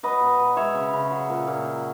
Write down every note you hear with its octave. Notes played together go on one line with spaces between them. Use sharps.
F#3 B4 D#5
B2
B2
G#3 C#5 E5
C#3
C#3
F#3
A#2
A#2
F#3